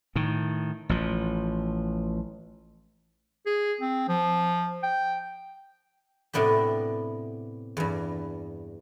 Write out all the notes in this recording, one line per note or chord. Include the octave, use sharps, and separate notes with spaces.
A2 D#3
A1 F3
G#4
C4
F3
G5
A2 C3 B3 D4 G4
E2 G2